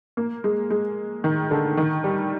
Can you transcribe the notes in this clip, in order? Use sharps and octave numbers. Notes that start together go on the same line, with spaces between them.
A#3
G#3
G#3
D#3
D3
D#3
G3